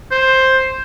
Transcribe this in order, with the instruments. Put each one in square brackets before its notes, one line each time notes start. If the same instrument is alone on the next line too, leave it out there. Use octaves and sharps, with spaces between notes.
[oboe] C5